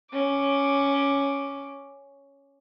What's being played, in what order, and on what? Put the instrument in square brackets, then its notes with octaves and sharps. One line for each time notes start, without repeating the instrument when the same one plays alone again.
[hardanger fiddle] C#4 D6